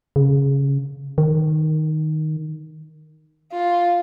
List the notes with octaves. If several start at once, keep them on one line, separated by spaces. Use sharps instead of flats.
C#3
D#3
F4